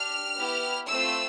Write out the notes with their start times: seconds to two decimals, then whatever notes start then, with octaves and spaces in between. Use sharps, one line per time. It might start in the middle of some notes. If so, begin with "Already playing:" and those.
Already playing: D4 G4 F6
0.37 B3 E4 G4
0.88 A3 C4 F4 E6